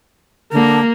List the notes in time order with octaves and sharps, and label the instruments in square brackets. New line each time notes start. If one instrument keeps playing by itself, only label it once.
[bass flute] D3 [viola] A#3